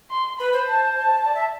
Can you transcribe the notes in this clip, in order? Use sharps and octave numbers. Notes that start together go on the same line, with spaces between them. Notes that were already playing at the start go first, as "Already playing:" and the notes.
C6
B4 B5
C5
A5
A5
D5
E5